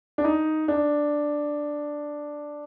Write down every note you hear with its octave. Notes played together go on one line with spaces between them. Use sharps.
D4
D#4
D4